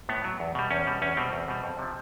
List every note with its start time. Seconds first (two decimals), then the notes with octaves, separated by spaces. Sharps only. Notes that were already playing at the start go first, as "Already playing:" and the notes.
0.09 A2 B3
0.24 F#3
0.40 E2
0.55 B2 G3
0.71 E2 C#4
0.87 B2 G3
1.02 E2 C#4
1.17 B2 G3 C4
1.33 E2
1.48 B2 G3
1.64 F2
1.79 C3 F3